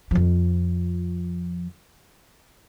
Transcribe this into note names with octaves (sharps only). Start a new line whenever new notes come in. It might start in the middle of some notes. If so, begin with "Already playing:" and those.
F2 F3